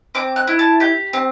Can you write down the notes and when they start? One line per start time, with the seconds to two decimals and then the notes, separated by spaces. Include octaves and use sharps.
0.15 C4 D6
0.36 F#6
0.48 E4
0.59 A5
0.80 G4 G6
1.13 C4